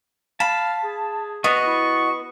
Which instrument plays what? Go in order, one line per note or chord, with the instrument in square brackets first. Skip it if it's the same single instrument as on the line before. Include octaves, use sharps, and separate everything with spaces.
[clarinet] F5 [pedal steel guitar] A5 [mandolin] B5
[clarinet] G#4
[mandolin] B3 [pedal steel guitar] F#4 D#5 [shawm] C#6
[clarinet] E4